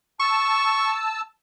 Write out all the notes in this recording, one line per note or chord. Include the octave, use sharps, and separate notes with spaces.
A5 C#6 E6